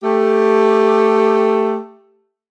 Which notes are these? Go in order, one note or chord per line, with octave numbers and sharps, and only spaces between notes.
A3 G4